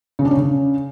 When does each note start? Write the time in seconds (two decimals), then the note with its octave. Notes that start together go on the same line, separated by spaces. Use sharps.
0.19 C#3
0.25 D4
0.31 C#4
0.37 C#3